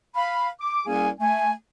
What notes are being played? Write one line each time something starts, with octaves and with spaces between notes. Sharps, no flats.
F5 B5
D6
C2 A#3 C#4 G#4 G#5
A3 G#5